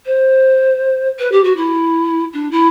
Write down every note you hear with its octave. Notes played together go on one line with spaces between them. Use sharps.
C5
B4
G4
F#4
E4
D4
E4